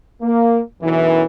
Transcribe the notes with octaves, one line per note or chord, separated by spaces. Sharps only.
A#3
B1 F#2 E3